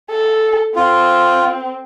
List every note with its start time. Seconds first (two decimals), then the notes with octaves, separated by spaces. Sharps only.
0.11 A4
0.76 C4 F4